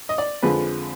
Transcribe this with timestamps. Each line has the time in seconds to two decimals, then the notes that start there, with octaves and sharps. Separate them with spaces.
0.09 D#5
0.18 D5
0.42 F2 D3 F3 G#3 B4